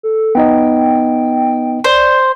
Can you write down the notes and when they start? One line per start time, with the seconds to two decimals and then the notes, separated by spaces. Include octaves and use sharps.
0.03 A4
0.35 B3 D#4 D#5 G5
1.84 C5 D5